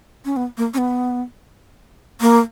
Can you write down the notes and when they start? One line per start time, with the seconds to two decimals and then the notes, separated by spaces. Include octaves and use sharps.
0.25 C#4
0.36 B3
0.57 A#3
0.74 C#4
0.78 B3
2.21 A#3